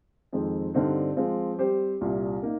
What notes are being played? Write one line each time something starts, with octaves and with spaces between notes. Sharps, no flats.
F2 D#3 G#3 C4
G2 D3 G3 C4 D#4
F3 G#3 C4 F4
G3 C4 G4 C5
C2 A#2 G3
A#3 D#4 A#4